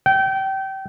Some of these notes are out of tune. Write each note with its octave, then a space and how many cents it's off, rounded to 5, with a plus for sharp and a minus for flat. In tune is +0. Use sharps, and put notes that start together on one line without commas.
G5 -25